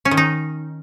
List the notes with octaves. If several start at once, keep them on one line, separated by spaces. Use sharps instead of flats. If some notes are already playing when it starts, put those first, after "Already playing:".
C#4
D#3
D#4